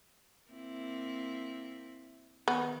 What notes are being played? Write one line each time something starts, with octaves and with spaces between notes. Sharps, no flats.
A#3 C4 E4
D#3 B3